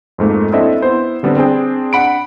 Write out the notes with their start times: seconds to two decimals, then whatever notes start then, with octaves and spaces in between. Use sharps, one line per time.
0.18 F2 G#2 A3 A#3
0.52 C4 D4 E4 A4 D#5 E5
0.82 B3 E4 C5
1.23 D3 G3 B3 C4 D4
1.37 C4 D4 G#4 G5
1.93 D4 F#5 B5 D7